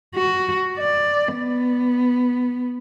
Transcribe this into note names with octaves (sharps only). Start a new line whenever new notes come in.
F#4
D5
B3